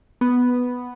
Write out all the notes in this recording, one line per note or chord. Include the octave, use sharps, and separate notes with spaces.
B3